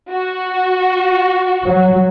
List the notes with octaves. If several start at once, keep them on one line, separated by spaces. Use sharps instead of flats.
F#4
F#3